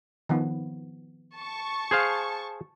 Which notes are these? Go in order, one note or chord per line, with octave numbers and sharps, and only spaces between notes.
D#3 F3 B3
A5 C#6
G#4 C5 F5